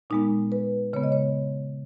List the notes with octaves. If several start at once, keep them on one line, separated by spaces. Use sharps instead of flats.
A#2 G#3 B3 D#4
B4
C#3 G#3 B3 C#5
D#5
C#5